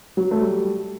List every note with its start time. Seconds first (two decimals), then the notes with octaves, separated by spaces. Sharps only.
0.17 F#3
0.31 A3
0.41 G3